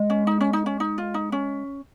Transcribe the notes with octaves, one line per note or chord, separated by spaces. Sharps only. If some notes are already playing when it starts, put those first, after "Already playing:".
Already playing: G#3
C#4
D#4
C#4
D#4
C#4
D#4
F4
D#4
C#4